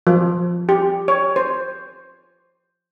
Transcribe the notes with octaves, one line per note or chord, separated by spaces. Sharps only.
F3
G4
C#5
C5